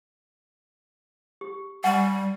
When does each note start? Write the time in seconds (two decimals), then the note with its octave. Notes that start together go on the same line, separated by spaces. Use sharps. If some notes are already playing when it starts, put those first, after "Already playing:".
1.41 G4
1.84 G3 F#5 G#5 C#6